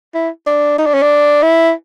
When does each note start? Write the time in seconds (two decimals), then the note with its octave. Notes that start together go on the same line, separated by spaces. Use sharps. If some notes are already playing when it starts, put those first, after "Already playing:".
0.14 E4
0.46 D4
0.78 D#4
0.86 D4
0.94 C#4
1.02 D4
1.42 E4